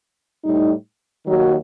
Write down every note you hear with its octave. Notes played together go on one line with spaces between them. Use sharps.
A2 G3 D#4
D#2 D#3 F#3